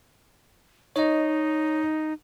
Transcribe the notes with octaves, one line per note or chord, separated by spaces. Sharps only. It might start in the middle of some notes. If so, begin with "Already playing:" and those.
D#4 C#5 D#5